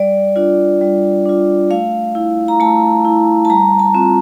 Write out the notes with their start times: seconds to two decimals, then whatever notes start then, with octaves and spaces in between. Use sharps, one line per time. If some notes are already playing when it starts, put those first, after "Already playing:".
Already playing: G3 D5
0.36 D4 F4
0.81 G3
1.26 D4 F4
1.70 A3 F5
2.15 E4
2.48 A#5
2.60 A3 A5
3.05 E4
3.45 A5
3.50 G3 A#5
3.79 A5
3.94 C4 F4